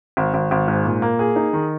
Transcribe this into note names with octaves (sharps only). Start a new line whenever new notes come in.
G#1
G#1
G#1
G#2
A#2
A#3
G#4
D#4
D#3